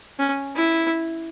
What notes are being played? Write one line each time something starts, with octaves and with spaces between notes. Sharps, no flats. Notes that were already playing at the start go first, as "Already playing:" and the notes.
C#4
E4